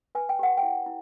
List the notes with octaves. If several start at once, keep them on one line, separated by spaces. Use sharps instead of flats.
B4 G#5
G5
G4 F#5
G5
E4
E4